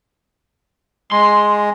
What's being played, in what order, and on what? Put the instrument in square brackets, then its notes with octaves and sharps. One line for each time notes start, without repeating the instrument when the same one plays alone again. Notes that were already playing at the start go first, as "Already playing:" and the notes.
[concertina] G#3 [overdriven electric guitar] C6